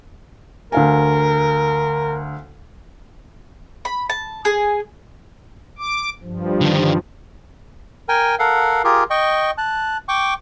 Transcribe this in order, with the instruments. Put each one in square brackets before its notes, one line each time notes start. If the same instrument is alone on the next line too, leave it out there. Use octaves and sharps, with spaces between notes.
[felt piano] D2 F5 G#5 [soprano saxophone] A#4
[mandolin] B5
A5
G#4
[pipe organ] D6
G2 F3
[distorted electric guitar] D3 D#3
[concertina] A#4 G5 G#5
A4 A#4 F5 F#5
F4 G4 G#4 A#4
D#5 G5 C#6
A5 F#6
G5 C#6 D6